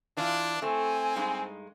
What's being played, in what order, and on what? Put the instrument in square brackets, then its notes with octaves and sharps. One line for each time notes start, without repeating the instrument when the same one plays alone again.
[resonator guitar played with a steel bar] E3 F4 [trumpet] D4
[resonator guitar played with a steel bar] A3 [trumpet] C4 [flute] G#5
[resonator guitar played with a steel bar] G2 G#3 D#4